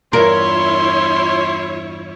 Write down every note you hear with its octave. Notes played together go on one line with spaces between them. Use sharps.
E2 G2 E4 F4 A#4 C#5 C6